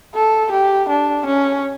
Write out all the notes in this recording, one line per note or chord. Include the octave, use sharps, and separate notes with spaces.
A4
G4
D4
C#4